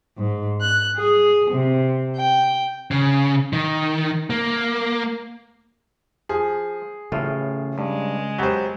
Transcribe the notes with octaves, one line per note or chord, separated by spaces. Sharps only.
G#2
F#6
G#4
C3
G5
C#3
D#3
A#3
F3 G#4
A1 A2 C#3 F4
G2 G#3
F#3 B3 G4 C5